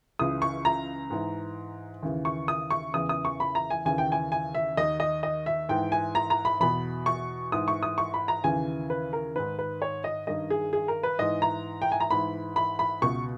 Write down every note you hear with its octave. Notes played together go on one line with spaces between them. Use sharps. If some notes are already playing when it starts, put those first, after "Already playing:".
C#2 C#3 E3 D#6
C#6
A#5
G#2 E3
D#2 C#3 E3
C#6
D#6
C#6
E2 C#3 E3 D#6
D#6
C#6
B5
A#5
G#5
D#2 C#3 E3 G#5
G5
G#5
G#5
E5
D#2 D#3 D#5
D#5
D#5
E5
G#2 E3 G5
G#5
A#5
A#5
B5
E2 B2 B5
C#6
G#2 E3 D#6
C#6
D#6
C#6
B5
A#5
D#2 C#3 E3 G#5
B4
A#4
G#2 D#3 B4
B4
C#5
D#5
G2 D#3 D#5
G#4
G#4
A#4
B4
G#2 E3 D#5
A#5
G5
G#5
A#5
G#2 E3 B5
B5
B5
C#2 B2 C#6